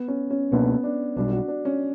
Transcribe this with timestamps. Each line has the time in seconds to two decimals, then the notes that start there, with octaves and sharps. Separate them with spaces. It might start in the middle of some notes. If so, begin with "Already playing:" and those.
Already playing: B3
0.08 C#4
0.30 C#4
0.51 C#2 B2 A#3 B3 D4
0.84 D4
1.16 B1 B2 G3 D4
1.32 F#4
1.48 D4
1.65 C#4